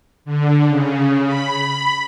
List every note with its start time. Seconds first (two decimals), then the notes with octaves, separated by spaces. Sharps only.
0.25 D3
0.68 C#3
1.26 B5